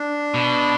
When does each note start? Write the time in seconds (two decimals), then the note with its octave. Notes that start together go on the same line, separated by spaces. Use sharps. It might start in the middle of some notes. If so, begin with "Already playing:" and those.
Already playing: D4
0.34 B2